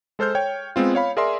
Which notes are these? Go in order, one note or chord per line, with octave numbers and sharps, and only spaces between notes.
G#3 A4 C5 F6 G6
C#5 G5 G#6
G#3 B3 C4 F4
C#5 F5 B5
G#4 A#4 D5 E5 G#5 C6